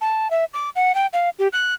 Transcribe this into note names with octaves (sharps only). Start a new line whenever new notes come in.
A5
E5
D6
F#5
G5
F5
G4
F#6